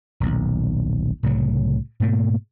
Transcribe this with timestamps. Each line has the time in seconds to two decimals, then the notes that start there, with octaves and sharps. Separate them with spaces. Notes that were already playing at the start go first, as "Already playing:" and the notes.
0.20 D#1 B1
1.23 C2 A2 C#3 F#3
2.00 G#2 B2 A3 A#3